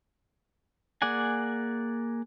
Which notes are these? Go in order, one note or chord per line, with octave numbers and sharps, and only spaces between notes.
A#3 G#4 D5 F#5 G#5